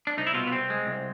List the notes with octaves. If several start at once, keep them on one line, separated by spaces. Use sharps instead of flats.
D4
C2 D#4
E4
B2 F4
B3
C2 C4
G#3
C2